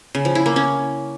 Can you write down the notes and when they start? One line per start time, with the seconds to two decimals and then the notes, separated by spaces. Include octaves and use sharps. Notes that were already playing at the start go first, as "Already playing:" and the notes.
0.15 C#3
0.25 F3
0.35 E4
0.46 A#3
0.56 C#4